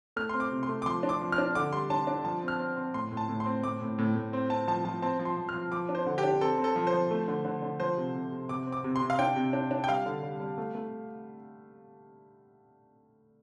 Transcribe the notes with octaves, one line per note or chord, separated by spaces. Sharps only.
A3 F6
C4 C6
D6
C3
C6
A3
D6
F3 C6
D4
D6
F3
F6
D4
D3 D6
G3 C6
D4 A5
D4
F3 A5
C4
F6
C4
C4
A2 C6
A2
A5
A2
C6
C4
A2 D6
A2
A2
A2
C4
C4 A5
F3 A5
F3 A5
C4 A5
F3
C6
F3
F6
F3
F3 D6
D4
C5
D3
G4
D4
C4 A4
C4
A4
F3
C5
F3
A3
D3
D3
D3
F3 C5
C3
C3
C3
C3 D6
C4
D6
C3
C6
C3
F5
D4 G5
C3
D4
D4
G5
G3 F5
D3
G3
G3
A3
A3